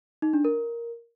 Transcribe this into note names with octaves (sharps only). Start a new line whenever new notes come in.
D#4
D4
A#4